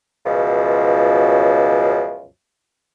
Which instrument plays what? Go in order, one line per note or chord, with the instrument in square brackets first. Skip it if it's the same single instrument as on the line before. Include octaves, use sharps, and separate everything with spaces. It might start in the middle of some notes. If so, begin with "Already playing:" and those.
[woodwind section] C#2 F#2 B2 F3